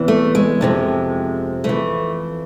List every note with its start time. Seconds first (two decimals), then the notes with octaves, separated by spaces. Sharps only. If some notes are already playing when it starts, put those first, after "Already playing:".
Already playing: E2 C3 E3
0.08 A3
0.35 G#3
0.61 F2 C3 F3
1.64 F2 E3 A3